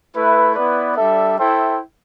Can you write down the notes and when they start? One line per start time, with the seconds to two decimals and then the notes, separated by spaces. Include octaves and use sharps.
0.13 A3 E4 B4 E5
0.54 B3 E4 B4 D5
0.96 G3 D4 A4 E5
1.37 E4 A4 C5 E5 G5